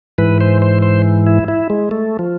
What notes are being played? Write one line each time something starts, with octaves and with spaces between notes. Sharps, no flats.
G#2 E3 B4
C5
C5
C5
E4
E4
G#3
A3
F3